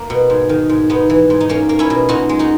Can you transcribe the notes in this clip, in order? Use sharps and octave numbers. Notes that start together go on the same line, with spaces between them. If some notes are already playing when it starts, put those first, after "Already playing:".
Already playing: A#3
B2
G#2
D#3
G#2
G#2 B3 D#4
E3
G#2
D#4
A#3 C#4
A#3
C#4 E4
B2
A#2 D#4 F#4
G#3
D#4 F#4